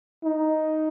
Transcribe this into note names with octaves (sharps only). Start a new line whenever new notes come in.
D#4